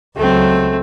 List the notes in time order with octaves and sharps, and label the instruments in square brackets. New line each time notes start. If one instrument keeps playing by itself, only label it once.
[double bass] C#2 F#3 [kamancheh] A3 C4